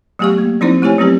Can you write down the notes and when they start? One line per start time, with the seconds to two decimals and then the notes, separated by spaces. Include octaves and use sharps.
0.19 F#3 A3 B3 G4 F5 C#6
0.38 A#3
0.61 F3 C4 D#4 E4 C5
0.82 A3 E4 G4 C#5 G#5
0.98 F#3 B3 C4 G4 B4